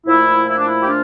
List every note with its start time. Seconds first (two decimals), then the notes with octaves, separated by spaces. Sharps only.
0.06 A#2 F3 A3 E4
0.47 E4
0.56 D4
0.65 E4
0.82 G4
0.86 D4 F4